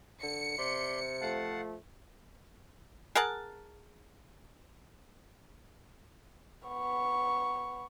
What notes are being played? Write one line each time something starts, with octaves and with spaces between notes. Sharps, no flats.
D3 C#7
C3 D5 B5 C6
F3 A3 F5 F#5 A5
G#4 A#4 F#5 A5
B3 C#6